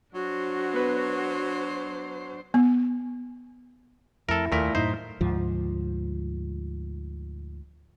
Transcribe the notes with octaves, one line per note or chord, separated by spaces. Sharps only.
F#3 D4 F#4 C5
B3 B4
B3
F2 A3 E4 A4 A#4
D#2 A#2 A3 A#4 B6
F#2 A2 D#4 C5
D2 G#2 F3